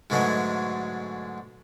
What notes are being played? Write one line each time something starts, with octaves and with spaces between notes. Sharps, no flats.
G#2 B2 D3 F#3 G#3 A3